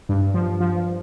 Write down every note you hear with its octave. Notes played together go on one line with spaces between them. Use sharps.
G2
F3
F3